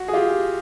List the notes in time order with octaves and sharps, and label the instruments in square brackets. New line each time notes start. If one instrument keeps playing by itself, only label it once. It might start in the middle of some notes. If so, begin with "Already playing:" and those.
Already playing: [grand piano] F#4
G#4
F4 G4